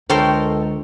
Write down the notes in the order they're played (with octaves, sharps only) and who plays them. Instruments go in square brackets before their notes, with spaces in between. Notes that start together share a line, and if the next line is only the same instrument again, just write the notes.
[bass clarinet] C#2 [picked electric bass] D3 [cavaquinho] A4 A#4 [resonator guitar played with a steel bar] C5 C#5 G5